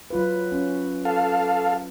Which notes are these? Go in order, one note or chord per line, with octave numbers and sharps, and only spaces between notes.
F#3 F4 B4
C#4
A4 F5